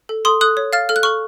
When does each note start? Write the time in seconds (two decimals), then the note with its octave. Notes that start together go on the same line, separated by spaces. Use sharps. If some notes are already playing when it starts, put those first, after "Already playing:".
0.09 A4
0.25 A4 C6 D#6
0.41 A4 D#6 F#6
0.57 C#5
0.73 F5 F6 A6
0.89 A4 F6
0.96 F#6
1.03 A4 C#6 F6